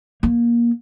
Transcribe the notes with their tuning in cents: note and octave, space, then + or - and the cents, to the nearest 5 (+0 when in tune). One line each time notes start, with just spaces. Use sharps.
A#3 +20